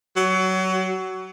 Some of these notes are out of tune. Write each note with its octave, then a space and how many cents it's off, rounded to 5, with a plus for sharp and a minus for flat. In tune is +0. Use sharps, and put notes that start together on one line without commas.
F#3 +25